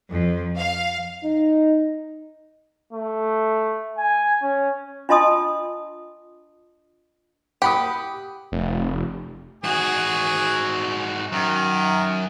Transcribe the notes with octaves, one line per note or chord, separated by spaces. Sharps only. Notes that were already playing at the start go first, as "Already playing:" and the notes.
F2
F5
D#4
A3
G#5
C#4
D4 F4 D#5 A5 C6 D#6
G4 F#5 B5 D#6
F1
G#2 F#4 G#4
F#2 D#3